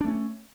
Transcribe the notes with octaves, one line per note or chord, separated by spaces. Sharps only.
A3 C#4 D4